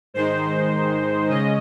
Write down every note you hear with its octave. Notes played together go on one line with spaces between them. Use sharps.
G#2 D#3 G#3 D#4 C5
C#3 G#3 C#4 D#5